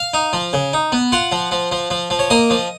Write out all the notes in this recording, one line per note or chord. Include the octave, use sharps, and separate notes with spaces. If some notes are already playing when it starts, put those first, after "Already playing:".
Already playing: F5
D#4
F3
C#3
D#4
B3
F4 F#5
F3
F3
F3
F3
F3
C#5
A#3 D#5
F3